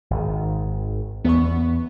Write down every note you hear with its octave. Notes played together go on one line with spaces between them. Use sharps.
G#1 D#3
E2 B3 C#6